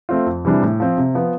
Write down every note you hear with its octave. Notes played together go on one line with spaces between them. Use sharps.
A3 C4 F4
F2
C3 E3 G3 D4
A2
F3 C4
C3
F3 B3